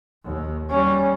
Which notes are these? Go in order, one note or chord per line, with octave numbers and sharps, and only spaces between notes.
D#2
G3 C#4